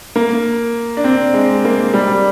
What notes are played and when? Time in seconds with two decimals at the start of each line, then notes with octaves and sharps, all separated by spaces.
0.16 A#3
0.97 D4
1.04 C4
1.34 G#3
1.65 A#3
1.94 G3